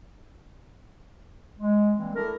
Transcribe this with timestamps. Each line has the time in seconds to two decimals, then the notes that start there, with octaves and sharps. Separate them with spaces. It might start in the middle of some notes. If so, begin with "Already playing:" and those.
1.60 G#3
1.96 E3 G3 G#3 A#3 C4
2.15 A3 D4 E4 A4 A#4